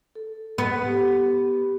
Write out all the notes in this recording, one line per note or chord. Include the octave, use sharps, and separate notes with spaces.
A4
B3
G4 B5